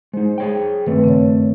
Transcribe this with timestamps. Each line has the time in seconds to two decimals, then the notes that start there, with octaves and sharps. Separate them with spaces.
0.13 G#3 D#4 C5
0.38 G#4 C#5 G5
0.87 G2 D#3 A3 C4 B4
1.04 C#3 C4 C#5